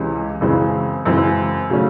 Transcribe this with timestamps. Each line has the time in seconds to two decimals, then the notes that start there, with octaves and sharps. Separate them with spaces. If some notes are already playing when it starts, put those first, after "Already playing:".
Already playing: C#2 C3 E3 G#3 C#4
0.41 F#2 C#3 E3 G#3 C4
1.06 F#2 C#3 E3 G#3 C4
1.70 C#3 F#3 A3 C#4